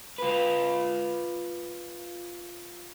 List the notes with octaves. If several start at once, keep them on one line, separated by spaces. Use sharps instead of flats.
F4 B4